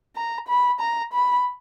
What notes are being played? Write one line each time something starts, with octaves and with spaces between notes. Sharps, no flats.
A#5
B5
A#5
B5